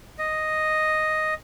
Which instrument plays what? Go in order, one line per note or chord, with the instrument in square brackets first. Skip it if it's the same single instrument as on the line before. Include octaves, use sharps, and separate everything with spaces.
[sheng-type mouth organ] D#5